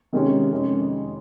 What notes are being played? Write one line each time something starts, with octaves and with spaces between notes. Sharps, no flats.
C3 D#3 G#3 C#4 G4
F2 C3 D#3 G#3 C#4